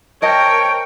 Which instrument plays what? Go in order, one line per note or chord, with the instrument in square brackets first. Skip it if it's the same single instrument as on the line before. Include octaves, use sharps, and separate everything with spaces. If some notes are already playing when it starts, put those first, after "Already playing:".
[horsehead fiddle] A#4 G5 [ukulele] C5 D#5 A5 [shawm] C#5 [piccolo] D7